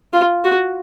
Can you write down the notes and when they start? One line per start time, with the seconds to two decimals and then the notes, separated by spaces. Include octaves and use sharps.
0.13 F4
0.44 F#4